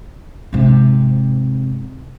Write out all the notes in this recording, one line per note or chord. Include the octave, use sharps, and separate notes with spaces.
G#2 C3